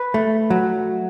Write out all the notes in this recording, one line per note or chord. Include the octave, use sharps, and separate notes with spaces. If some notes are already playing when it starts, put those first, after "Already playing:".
Already playing: B4
A3
F#3